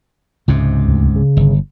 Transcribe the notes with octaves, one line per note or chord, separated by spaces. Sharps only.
C#2 G#2 C3
D2
C#3
G1